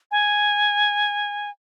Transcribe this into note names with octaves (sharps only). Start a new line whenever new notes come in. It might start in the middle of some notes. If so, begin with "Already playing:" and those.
G#5